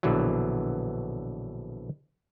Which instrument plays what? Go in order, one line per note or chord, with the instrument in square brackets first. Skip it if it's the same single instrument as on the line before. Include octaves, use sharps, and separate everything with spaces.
[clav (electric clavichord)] A#1 B2 D3 E3 F#3